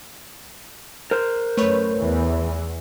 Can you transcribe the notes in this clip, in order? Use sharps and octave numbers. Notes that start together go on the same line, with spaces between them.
A#4 C5
F#2 A3 B4 C#5
E2 E3